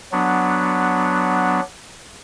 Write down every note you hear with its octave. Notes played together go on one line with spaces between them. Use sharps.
F#3 B3 D4